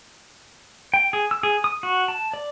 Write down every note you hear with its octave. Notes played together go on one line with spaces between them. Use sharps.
G5
G#4
E6
G#4
D#6
F#4
A5
D5